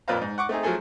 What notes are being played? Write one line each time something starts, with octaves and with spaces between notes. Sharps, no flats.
F2 A#2 B4 C5 F5 A#5
G#2
F#5 C#6 D6
A3 C4 D#4 G#4
F3 F#3 A3 G#4 A4